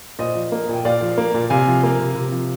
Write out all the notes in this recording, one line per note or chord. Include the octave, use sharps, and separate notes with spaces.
A#2 C5 D#5
F3
A#3
A#2 G5
A#2 D5 F5
F3
A#3
A#2
C3 F5 G#5
F3
A#3
C3
C3
F3